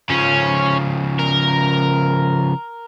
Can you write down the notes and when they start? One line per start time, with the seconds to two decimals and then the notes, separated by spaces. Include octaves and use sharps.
0.10 C#3 F3 C#4
1.19 A#4